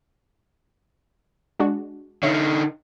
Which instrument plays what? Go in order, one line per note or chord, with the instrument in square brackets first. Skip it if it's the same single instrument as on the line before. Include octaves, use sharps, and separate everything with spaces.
[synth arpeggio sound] G#3 D4 F#4
[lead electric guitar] D3 D#4 [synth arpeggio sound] C#5 E5 F5